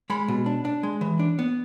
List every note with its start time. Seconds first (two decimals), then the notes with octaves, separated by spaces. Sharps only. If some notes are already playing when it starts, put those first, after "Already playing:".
0.10 G#3 B5
0.28 B2
0.46 D4
0.65 D4
0.83 G#3
1.01 E3
1.19 D4
1.39 B3